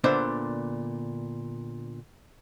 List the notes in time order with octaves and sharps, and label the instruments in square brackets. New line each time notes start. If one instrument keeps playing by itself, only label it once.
[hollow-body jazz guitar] A#2 D3 B3 D4 C5 E5